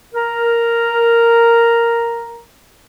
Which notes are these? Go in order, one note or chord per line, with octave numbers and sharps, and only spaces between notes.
A#4 A#5